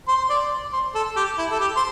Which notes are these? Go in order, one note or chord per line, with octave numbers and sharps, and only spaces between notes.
C5
D5
C5
A4
G4
E4
A4
G4
C5